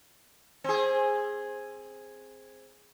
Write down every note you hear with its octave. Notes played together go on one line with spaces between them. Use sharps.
C4 G#4